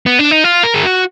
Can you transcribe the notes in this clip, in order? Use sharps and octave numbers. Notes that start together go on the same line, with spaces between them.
B3
D4
D#4
F4
A#4
G#4
F#4